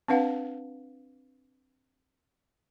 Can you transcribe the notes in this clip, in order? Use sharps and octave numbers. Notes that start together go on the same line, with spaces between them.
C4 D4 B4 F5 F#5